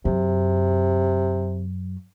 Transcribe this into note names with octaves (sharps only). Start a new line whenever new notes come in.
F#2 C3